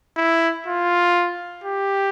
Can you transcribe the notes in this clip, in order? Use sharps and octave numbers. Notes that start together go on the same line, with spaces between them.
E4
F4
G4